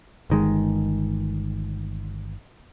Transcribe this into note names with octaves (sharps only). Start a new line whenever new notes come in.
G1 D#3 G#3